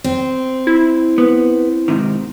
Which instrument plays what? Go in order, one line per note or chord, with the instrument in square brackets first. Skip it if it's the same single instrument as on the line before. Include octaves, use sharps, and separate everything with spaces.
[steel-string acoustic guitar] C4
[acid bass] E4
[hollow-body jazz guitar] B3
G#2 C3 D#3